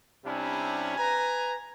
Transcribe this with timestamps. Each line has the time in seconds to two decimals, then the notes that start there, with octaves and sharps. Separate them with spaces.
0.24 C3 G3 C#4 D4 E4
0.97 B4 G#5 A#5